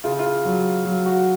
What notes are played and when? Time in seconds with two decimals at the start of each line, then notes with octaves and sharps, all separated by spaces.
0.04 C#3 F4
0.19 F4
0.45 F#3
0.85 F#3
1.06 F#4